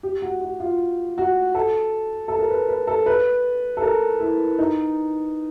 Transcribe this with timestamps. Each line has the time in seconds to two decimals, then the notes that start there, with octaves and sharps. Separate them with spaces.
0.03 G4
0.22 F#4
0.41 F#4
0.60 F4
1.18 F#4
1.55 A4
2.28 A4
2.39 A#4
2.50 B4
2.69 B4
2.87 A4
3.06 B4
3.77 A4
3.82 A#4
4.20 E4
4.59 D#4